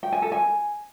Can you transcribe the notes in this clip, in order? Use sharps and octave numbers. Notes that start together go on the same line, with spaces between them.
G5
G#5
A4
G#5